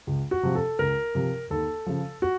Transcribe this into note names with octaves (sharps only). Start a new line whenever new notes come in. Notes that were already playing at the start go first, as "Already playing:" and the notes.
C#2
F#4
C3 F3
A4
C#2 A#4
C3 F3
D#2 A4
C#3 F3
F#4